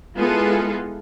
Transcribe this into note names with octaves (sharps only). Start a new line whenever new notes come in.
G#3 B3 E4 F4 G#4 A4